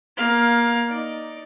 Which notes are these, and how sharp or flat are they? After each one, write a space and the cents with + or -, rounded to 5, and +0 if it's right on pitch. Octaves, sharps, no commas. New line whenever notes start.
A#3 +20 F5 +15
D#4 +5 D5 +0